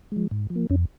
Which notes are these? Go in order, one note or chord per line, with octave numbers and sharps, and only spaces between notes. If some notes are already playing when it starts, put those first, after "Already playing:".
F3 G#3
G#2
F3
A#3
F2 C#4